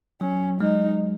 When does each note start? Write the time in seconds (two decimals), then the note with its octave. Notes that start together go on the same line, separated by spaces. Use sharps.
0.21 F#3 C#4
0.61 G#3 D#4